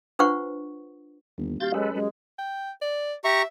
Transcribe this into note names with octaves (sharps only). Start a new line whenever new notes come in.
D4 F4 B4 C5 F#5 C#6
G1 D#2
D#1 F#4 G4 D5 F5 G6 A6
F#2 G#3 A4 B4 C#5 G#5 D#6
F#2 G#3
G5
D5
G4 E5 A#5 C#6